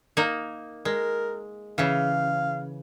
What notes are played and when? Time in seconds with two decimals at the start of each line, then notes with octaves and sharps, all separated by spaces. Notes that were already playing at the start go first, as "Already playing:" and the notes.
0.17 A#3 D#4
0.85 G#3 A#4
1.78 C#3 E3 F5